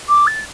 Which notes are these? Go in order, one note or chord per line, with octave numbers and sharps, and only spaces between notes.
D6
A6